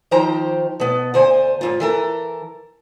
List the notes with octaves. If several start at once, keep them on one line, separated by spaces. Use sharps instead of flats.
D#3 F3 C5 G5 A#5
B2 B3
D2 C5 G#5
G#2 E3 F4
E3 A4 A#4